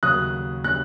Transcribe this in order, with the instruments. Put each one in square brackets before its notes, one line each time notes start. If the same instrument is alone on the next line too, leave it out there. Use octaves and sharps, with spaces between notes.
[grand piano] D#2 C#3 F#3 [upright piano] D#6 F#6
[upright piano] F#6